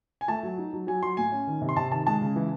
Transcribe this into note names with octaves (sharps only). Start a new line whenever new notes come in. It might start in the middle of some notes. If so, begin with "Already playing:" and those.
G#5
A3 A5
F#3
D#4
F#3
F#3 G#5
F#3 C6
A2 G#5
C#4
D#3
C3
C6
C3 A5
D#3 A5
G#3 A5
C#3
E3